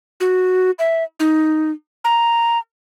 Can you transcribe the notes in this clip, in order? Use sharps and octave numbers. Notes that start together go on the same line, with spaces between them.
F#4
E5
D#4
A#5